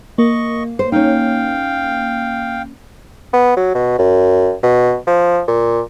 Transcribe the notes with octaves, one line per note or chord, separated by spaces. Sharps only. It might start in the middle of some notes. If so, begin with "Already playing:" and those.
A#3 D#5 C#6
C5
C#4 D#4 F5 G5
B3
F#3
B2
F#2
B2
F3
A#2